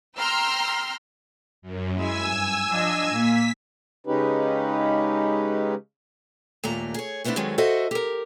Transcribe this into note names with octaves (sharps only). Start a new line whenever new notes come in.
G5 A#5 C6 E6 F6
F#2
G#3 E4 E5 G#5 E6
G2
F3 D4 D#5
A#2 A#3 B6
C#3 G#3 C#4 D#4 G4 B4
D#2 A#2 A3 A#5
G#4 C#5
G3 A3 B3 C4 D4 E4
G2 D#3 F#3 G#3 A3 C4
F#4 A4 C5 D#5 E5 F#5
G4 A#4